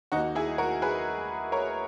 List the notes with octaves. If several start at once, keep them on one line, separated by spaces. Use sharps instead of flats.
D#2 D#3 A#3 D#4 F#4
E4 G#4
F#4 A#4
G#4 B4
A#4 C#5